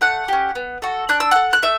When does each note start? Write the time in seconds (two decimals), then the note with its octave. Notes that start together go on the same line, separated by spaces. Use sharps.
0.01 A3 F#5 F#6
0.28 C#4 G4
0.55 B3
0.82 F#4 A4
1.09 D4 F#6
1.20 E6
1.31 A4 F#5 F#6
1.53 F#6
1.62 A3 E5